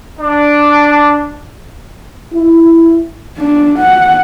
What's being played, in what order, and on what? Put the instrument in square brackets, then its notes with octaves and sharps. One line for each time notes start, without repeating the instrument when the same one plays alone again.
[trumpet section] D4
[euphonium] E4
[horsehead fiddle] D4
F#5